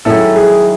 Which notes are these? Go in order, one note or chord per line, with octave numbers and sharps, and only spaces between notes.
F#2 D#3 G#3 C#4 E4 A4
G#4